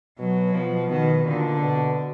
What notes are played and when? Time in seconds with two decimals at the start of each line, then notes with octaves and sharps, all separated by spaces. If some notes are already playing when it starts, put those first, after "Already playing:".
0.19 B2 F#3
0.54 B2 F3
0.90 B2 D#3
1.26 A#2 D3
1.61 B2